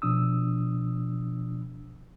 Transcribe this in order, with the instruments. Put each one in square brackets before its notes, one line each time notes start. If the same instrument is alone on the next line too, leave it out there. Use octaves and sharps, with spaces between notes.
[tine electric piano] B2 F3 D4 D#6 E6